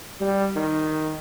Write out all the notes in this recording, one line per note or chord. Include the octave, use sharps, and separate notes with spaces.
G3
D#3